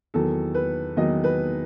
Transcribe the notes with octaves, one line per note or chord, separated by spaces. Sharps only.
E2 D#3 F#3 A4
B4
E2 D#3 F#3 D#5
B4